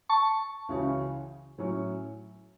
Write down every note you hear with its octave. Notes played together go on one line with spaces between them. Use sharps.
A5 C#6
C#2 C#3 E3 C#4 F#4
A2 F#3 C#4